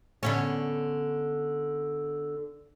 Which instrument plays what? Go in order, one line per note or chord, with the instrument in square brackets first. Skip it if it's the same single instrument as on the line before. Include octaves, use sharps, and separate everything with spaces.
[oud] D3 B3 C#4